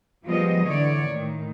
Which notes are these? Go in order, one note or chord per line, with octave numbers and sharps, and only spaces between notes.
F3 G3 G#3 B3 D#5
D3 E3 C#5 D5
A2 D#3